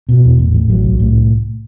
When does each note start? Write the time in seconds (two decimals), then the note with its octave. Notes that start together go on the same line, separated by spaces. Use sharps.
0.09 B2
0.24 E2
0.39 A1
0.54 A1
0.70 F#3
0.84 C2
1.00 A2